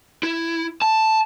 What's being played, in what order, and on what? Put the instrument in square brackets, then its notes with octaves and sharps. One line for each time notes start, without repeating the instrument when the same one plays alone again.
[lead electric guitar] E4
A5